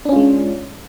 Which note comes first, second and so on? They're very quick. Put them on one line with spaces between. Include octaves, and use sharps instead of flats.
D4 C#4 F4 G#3